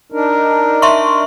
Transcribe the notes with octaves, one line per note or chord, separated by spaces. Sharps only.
D4 D#4 A#4
E5 C6 C#6